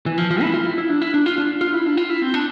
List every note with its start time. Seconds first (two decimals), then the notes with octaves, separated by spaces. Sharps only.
0.06 E3
0.18 F3
0.31 F3
0.42 E4
0.54 F4
0.66 E4
0.78 E4
0.89 D4
1.02 E4
1.14 D4
1.26 F4
1.38 D4
1.61 F4
1.74 E4
1.86 D4
1.97 F4
2.10 E4
2.22 C4
2.34 D4